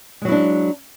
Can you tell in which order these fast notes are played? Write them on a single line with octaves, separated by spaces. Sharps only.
G#3 F#3 E4 D4